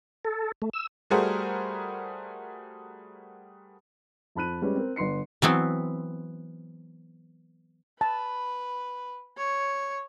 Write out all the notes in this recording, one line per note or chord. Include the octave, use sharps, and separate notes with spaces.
A4
A3
E6
G3 A3 F#4 G#4 A#4 C5
F2 A5 B5 F#6 D#7
G3 G#3 C#4 B4
C4 A#4
G1 B4 C6 C7 C#7
E3 F#3 B3 C4
B4 A5
C#5